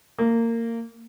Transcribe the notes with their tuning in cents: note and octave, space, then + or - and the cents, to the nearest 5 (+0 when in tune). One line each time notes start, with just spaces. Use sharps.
A#3 -20